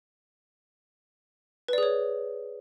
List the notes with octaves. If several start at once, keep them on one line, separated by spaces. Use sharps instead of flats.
G#4 B4 C#5 D5